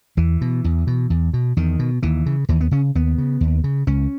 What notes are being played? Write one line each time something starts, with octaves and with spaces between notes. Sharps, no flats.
E2 E3
B2
E2
B2
E2
B2
E2 D#3
B2
D#2 E3
C#3
D#2 E3
B3
C#3 C#4
D#2 B3
C#3
D#2
C#3
C#2 C#4